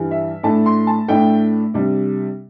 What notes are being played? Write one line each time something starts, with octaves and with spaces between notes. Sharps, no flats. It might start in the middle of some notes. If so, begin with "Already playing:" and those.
Already playing: G2 E3 G3
E5
A2 A3 D4 A5
C6
A5
A2 A3 D4 G5
C3 G3 D4